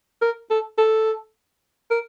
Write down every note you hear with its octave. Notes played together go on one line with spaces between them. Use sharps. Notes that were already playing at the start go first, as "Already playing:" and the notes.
A#4
A4
A4
A#4